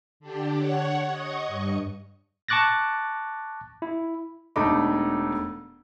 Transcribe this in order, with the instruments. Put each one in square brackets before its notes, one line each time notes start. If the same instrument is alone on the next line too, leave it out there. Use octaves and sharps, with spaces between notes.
[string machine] D3 D4 G4
C#5 F#5
D#5 C#6 D#6
G2 C#7
[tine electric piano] A5 C#6 D6 F#6 A6 A#6
E4
[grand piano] E1 A3 D4 D#4 B5 D6